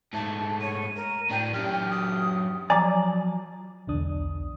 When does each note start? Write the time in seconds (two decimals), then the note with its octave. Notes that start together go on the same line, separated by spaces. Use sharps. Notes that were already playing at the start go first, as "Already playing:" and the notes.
0.13 G#2 A3 A5
0.61 C#5 D#7
0.96 A#4
1.31 A2 D4 G5
1.53 F#2 G4 F6
1.89 D#6
2.70 F3 F#3 D5 G#5 A#5 D6
3.87 B1 E2 D3 D4 D#6